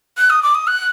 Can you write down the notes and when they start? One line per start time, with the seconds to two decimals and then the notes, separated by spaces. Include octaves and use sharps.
0.18 F#6
0.30 D#6
0.43 D6
0.55 D#6
0.67 F#6